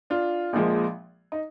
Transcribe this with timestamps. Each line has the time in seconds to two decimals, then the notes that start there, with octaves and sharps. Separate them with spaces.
0.10 D4 F4
0.53 A#1 A#2 F3 G#3
1.32 D#4